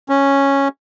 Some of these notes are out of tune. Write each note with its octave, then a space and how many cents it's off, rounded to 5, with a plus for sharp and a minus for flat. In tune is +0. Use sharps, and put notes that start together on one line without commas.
C#4 -5